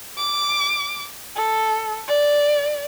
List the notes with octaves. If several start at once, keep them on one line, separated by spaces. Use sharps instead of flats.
D6
A4
D5